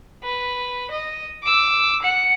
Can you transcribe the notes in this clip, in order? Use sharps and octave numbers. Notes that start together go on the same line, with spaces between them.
B4
D#5
D6 E6
F#5 C#7